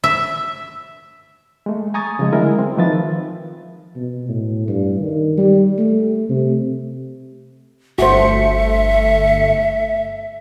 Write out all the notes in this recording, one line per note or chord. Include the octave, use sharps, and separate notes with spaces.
E5
G#3 A3
G#5 A#5 C#6 D#6 G#6 A6
C#3 F3 G#3
D3 F#3 G#3 A3 E4 A#4
C4
D#3 F3 B4 E5 A6
B2
A2
G2
D#3
G3
A3
C3
G1 A3 F#4 C5 E5 C#7